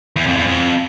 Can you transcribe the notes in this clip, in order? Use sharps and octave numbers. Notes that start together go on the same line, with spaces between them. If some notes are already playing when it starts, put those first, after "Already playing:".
E2
F2
E2
F2